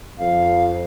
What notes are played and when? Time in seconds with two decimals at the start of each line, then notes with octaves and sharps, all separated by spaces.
0.19 F2 F5